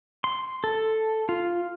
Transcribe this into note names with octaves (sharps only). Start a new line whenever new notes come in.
C6
A4
F4